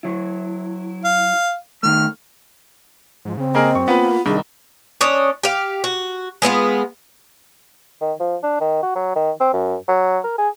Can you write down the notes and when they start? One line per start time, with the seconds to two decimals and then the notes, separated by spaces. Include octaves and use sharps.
0.03 F#3 E4
1.04 F5
1.83 D#3 A3 F6
3.25 G#2 F3
3.37 C#3 C4
3.55 A#3 G#4 A#4 D#5
3.75 F#2 C#6
3.88 A#3 B3 F4 B4
4.26 C2 D#3 D4 G#4
5.01 C#4 D4 C#5 D#5
5.43 G4 F5
5.84 F#4
6.42 G#3 B3 E4 F4
8.01 D#3
8.20 F3
8.43 D4
8.60 D#3
8.83 F#4
8.95 F#3
9.16 D#3
9.40 C4
9.53 F#2
9.88 F#3
10.24 A#4
10.38 G#4